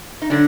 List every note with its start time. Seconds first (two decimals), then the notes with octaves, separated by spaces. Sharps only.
0.22 D#4
0.30 D3 D#3 F#3 D4